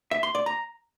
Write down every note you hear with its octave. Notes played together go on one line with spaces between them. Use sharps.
E5
C6
D5
A#5